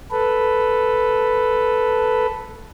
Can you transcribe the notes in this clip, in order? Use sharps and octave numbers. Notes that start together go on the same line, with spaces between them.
A4 B4